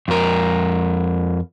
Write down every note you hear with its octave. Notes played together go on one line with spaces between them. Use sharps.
F2 A#4